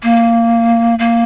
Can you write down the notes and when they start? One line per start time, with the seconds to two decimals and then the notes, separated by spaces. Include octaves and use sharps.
0.03 A#3
0.99 A#3